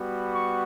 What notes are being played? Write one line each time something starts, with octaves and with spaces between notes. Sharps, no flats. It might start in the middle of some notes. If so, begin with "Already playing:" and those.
Already playing: G3 B3 F#4
C#6